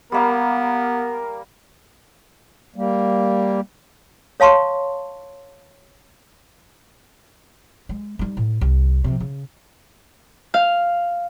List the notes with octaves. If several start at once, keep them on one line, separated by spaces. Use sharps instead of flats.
G3 A#3 B3 A#4 F5
G3 A#3
C#5 F5 A5 C6 C#6
G#3
G3 D#4
A2
C2
C3 F3
C#3
F5